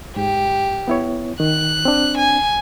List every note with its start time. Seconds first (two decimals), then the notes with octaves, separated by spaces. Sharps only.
0.16 G#2 G4
0.88 B3 E4 C#5
1.40 D#3 F#6
1.85 C4 D4
2.17 G#5